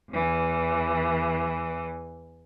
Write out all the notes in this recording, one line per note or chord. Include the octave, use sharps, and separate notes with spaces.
E2 E3